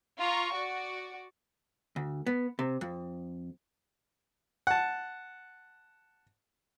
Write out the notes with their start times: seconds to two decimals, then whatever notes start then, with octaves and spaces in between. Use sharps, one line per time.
0.19 F4 A#5 C#6
0.53 F#4 D5
1.96 D2
2.26 B3
2.59 C3
2.81 F2
4.67 F#5 A5